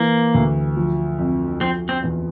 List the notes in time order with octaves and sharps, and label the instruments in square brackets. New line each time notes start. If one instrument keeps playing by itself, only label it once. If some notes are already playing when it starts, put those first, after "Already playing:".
Already playing: [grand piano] E3 [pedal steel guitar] A#3
[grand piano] D2
F3
F2
[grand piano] F3 [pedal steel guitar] C4
[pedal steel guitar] C4
[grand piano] E2